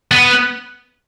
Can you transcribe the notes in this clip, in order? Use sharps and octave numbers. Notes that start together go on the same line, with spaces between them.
B3